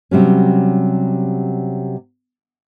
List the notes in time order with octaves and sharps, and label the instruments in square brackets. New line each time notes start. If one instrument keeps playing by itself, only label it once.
[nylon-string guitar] C3 F#3 G3 C#4